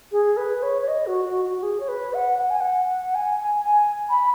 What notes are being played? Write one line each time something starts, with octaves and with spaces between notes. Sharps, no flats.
G#4
B4
C#5
C#5
D#5
F#4
F#4
F#4
F#4
G#4
C#5
B4
F#5
F#5
G#5
F#5
G#5
G#5
G#5
B5